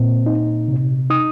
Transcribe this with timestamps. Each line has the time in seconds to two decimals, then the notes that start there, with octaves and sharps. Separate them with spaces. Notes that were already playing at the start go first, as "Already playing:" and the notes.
Already playing: A#2 C4
0.26 D#4
0.68 C3
1.10 D#4 D#6